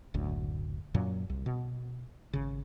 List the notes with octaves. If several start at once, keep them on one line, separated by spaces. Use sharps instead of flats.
F#1 D2 A2
F#2 A#2 F#3
C2
B2
G#1 C#3